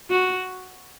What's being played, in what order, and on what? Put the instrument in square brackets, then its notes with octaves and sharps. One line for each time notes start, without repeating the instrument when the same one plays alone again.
[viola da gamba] F#4